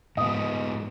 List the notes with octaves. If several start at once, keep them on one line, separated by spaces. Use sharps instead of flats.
G#2 B3 D#5